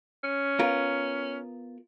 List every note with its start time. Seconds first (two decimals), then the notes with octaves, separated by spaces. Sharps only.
0.24 C#4
0.59 B3 F4 A#4